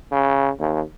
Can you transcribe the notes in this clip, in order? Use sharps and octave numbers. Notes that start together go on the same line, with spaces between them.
C#3
D#2